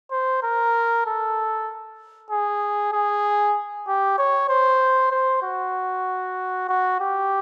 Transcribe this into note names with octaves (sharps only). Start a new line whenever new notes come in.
C5
A#4
A4
G#4
G#4
G4
C#5
C5
C5
F#4
F#4
G4